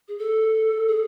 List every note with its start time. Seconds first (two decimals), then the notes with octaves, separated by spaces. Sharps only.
0.08 G#4
0.19 A4
0.88 G#4